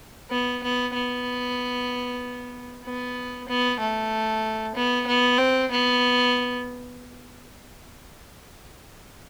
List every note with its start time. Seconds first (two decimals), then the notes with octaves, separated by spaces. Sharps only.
0.31 B3
0.63 B3
0.94 B3
2.85 B3
3.49 B3
3.80 A3
4.75 B3
5.07 B3
5.39 C4
5.71 B3